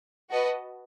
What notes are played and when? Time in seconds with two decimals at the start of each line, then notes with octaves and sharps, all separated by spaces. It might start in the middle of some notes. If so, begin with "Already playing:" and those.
0.30 F#4 B4 D#5 A5